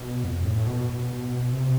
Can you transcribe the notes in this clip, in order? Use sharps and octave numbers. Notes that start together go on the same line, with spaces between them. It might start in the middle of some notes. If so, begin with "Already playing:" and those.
Already playing: B2
F2
A2
B2
C3